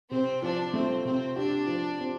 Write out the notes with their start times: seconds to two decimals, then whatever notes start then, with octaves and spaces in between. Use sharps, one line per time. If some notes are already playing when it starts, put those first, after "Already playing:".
0.10 C3 C4
0.41 F3 D4
0.74 A3 C4
1.05 C3 C4
1.36 D4 G4
1.67 F3
1.99 C4